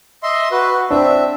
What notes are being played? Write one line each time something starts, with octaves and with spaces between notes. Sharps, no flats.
D#5 E5 C6
F#4 B4
C4 D4 E5